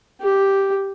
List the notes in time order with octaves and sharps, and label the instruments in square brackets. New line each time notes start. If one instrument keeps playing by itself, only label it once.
[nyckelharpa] G4